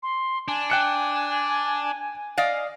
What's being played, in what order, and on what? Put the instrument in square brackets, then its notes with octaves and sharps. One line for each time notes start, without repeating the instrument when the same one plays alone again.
[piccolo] C6
[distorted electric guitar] D4 [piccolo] G#5
[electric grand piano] G5 F#6 C#7
[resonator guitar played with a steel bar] D5 D#5 F5